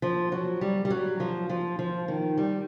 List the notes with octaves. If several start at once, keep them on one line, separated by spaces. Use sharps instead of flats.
F3
F#3
G3
G3
F#3
F3
F3
F3
D#3
G3